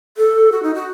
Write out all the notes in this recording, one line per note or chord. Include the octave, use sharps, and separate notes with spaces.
A4
F#4
D#4
F#4